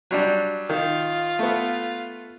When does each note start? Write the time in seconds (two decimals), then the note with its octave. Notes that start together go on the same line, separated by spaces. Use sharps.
0.11 F#3 G3 D4
0.70 D#3 F4 F5
1.39 A3 B3